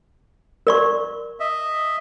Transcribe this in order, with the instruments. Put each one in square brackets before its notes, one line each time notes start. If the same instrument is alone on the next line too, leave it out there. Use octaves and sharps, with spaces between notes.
[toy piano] A#4 D5 C#6
[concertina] D#5 E5